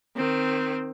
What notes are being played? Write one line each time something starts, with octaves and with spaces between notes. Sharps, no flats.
D#3 C4